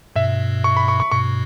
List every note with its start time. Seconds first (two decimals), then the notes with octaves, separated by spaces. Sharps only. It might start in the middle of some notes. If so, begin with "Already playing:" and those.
0.16 G2 B2 E5
0.64 C#6
0.77 B5
0.88 C#6
1.00 C#6
1.11 G2 B2 C#6